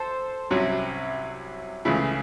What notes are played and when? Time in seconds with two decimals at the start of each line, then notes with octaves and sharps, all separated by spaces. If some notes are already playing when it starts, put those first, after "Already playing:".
Already playing: A4 C5
0.50 C2 C3 F#3 C#4
1.85 C#2 C#3 E3 A3